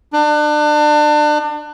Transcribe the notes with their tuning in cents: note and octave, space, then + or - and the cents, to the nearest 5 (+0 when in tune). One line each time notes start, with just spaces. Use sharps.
D4 +30